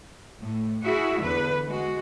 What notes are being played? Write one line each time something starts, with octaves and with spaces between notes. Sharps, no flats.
A2
E4 F#4 G#4 E5
E2 D3 B4
G#3 F#4